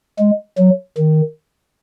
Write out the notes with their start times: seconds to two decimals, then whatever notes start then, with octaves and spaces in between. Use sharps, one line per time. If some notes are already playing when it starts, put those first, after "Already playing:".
0.19 G#3
0.58 F#3
0.98 D#3